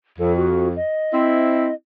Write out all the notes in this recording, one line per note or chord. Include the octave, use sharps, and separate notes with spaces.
F2 A4
F#4
D#5
C4 E4